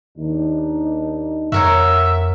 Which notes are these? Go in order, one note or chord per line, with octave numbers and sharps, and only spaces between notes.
D#2 D4 D#4
F2 F#4 A#4 C#5 E5